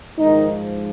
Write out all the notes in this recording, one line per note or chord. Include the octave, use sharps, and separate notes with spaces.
G#2 D#3 F3 D#4